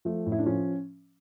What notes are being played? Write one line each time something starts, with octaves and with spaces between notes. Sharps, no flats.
F3 A3
A2
E4
D4
F3 C#4